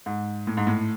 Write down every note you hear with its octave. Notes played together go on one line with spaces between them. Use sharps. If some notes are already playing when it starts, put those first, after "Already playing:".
G#2
A2
G#2
A2